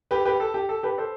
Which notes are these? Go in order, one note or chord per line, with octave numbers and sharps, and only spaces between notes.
G4 B4
G4 B4
A4
G4
A4
G4 B4
A4 C5